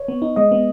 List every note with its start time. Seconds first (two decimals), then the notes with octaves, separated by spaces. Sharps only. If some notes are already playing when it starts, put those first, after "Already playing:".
Already playing: C#5
0.08 B3
0.22 D#4
0.36 G#3 D#5
0.52 B3